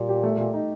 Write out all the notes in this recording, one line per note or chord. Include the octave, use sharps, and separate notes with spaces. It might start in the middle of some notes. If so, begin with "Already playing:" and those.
Already playing: A#2 G3
G4
A3
A3
D#4